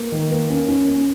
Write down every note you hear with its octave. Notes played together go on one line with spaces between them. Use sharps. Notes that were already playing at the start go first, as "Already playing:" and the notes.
Already playing: A#3
D#3
A#3
C#4
C#4
C#4